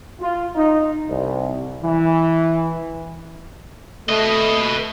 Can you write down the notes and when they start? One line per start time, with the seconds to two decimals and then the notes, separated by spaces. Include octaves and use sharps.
0.21 F4
0.56 D#4
1.08 C2
1.82 E3
4.09 A3 B4 D#5